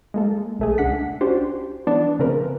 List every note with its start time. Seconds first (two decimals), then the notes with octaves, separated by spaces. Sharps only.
0.14 G#3 A#3 A4
0.59 B1 A3 G#4
0.78 C#2 D4 F#5 B6
1.21 C#4 D4 F#4 G4 C5
1.87 E3 B3 D4
2.19 C#3 F3 A3 C4 A#4 B4